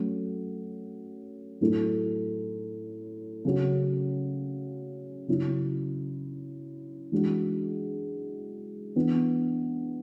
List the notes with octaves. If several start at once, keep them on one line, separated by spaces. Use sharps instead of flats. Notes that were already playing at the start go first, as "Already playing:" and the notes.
Already playing: F#3 A3 C#4 F#4
A2 F#3 A3 E4
C#3 F#3 C#4 F#4
C#3 F#3 C#4 E4
E3 G#3 D4 F#4
E3 B3 D4